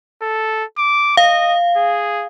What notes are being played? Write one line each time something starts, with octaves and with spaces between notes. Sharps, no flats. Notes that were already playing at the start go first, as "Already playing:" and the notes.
A4
D6
D#5 F5
G#4